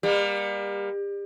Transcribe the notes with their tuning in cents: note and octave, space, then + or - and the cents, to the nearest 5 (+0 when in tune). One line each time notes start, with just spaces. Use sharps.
G3 +35 A#3 +35